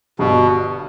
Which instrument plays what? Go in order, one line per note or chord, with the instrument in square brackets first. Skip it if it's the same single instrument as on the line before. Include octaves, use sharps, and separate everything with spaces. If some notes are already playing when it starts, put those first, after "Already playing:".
[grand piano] G1 G2 [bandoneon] B2